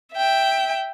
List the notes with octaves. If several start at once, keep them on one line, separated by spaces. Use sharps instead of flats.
E5 G5